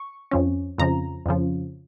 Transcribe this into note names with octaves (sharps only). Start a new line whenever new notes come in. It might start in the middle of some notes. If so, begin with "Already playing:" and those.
Already playing: C#6
F2 F3 C#4
F2 C#3 F3 A#5
F2 C#3 F3